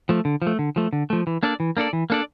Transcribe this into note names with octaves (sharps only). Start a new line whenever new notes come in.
F3 A3
D3
F3
A3
D3
F3 A3
D3
F3 A3
E3
A#3 D4 A4 D5
E3
A#3 D4 A4 D5
E3
A#3 D4 A4 D5